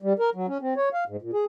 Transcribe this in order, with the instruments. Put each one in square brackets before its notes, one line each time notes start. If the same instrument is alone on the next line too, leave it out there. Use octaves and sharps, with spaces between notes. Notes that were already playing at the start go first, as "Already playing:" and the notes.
[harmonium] G3
A#4
F#3
C#4
C4
C#5
F5
G#2
A#2
G#4